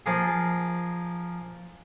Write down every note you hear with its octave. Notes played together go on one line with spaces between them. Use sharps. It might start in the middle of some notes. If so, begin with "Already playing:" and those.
F3 A#3 G#4